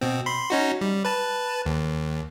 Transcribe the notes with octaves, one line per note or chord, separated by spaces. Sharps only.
B2 C4
B5 C6
C#4 D#4 F#4
G3
B4 A5
D#2